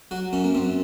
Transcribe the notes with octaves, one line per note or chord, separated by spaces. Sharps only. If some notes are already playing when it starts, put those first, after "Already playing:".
F#3 F#4
F#2 C#4
A#3
F#2 C4